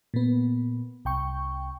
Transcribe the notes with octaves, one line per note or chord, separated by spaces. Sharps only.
A#2 B3
C2 G5 C#6